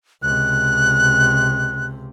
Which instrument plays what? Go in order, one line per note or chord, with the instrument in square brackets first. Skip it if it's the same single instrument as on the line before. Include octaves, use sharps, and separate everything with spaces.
[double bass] C#2 C3 [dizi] F#6